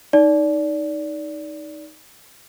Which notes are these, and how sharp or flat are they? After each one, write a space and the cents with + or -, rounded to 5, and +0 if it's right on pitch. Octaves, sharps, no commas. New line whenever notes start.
D#4 +0 D5 -20